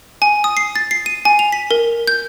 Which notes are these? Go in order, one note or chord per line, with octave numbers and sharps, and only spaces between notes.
G#5
D#6
C7
A6
C7
D#7
G#5
F7
B6
A#4
G6